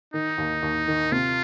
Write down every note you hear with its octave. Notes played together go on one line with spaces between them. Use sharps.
D#3 D#4
D#2
D#2
D#3
C3 F4